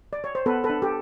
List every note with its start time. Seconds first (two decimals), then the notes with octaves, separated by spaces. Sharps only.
0.13 D5
0.24 C#5
0.35 C5
0.46 B3 A4 B4
0.64 A4 B4
0.70 D4
0.82 G4 A4